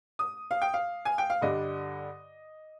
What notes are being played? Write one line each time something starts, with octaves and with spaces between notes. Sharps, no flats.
D#6
F5
G5
F5
G#5
G5
F5
G2 D3 G3 D4 D#5